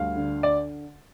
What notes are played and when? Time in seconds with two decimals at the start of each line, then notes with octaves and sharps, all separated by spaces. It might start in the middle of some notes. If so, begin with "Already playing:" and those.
Already playing: D2 G3 F5
0.16 D3
0.43 D5